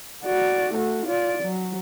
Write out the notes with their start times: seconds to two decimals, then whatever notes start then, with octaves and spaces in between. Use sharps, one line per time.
0.25 F#4 D5
0.74 A3 F#4
1.06 F4 D5
1.43 F#3